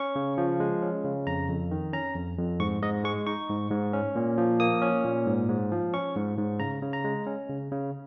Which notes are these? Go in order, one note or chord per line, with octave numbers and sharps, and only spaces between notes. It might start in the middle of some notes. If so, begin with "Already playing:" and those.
Already playing: C#4 C#6
C#3
F3
G#3
C#4
C#3
F2 A#5
F2
D#3
C#4 A#5
F2
F2
G#2 C#6
G#2 D#5
G#3 C#6
D#4 C#6
G#2
G#2
C#4
A#2
F3
A#3 D#6
C#4
A#2
G#2
G#2
F3
C#4 C#6
G#2
G#2
C#3 A#5
C#3
A#5
G#3
C#4
C#3
C#3